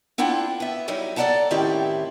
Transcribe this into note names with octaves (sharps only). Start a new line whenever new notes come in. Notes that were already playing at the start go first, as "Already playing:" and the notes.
C4 D4 E4 F4 F#5 G5
B3 E5
F#3 G3 D#4 E4
A4 D5 D#5 F#5 A5 A#5
A2 D#3 C4 C#4 E4 G4